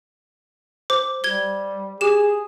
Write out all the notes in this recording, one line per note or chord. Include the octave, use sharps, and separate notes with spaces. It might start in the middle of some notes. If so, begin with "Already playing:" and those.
C5 D6
G3 G#6 G7
G4 G#4 E7